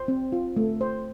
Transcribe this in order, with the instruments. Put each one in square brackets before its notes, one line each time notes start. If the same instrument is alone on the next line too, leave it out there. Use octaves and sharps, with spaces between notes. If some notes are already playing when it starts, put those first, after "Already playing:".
Already playing: [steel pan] C5
C4
F4
A3
C5